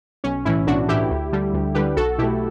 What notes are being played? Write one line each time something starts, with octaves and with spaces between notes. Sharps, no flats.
B1 C#4
A2 E3 C#4 E4
B1 D4 F#4
A2 E3 E4 G4
D2
D3 G3
D2
D3 G3 G4 B4
B1 F#4 A4
B2 A3 E4 G4